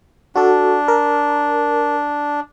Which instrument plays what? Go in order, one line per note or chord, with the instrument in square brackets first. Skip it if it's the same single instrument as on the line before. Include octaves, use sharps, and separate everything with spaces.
[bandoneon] D4 [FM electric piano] F#4 A4
[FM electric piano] A#4